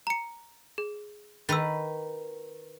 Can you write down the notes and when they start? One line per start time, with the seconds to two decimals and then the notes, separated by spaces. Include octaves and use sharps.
0.07 A#5 C#7
0.78 G#4
1.49 D#3 B4 E6 A6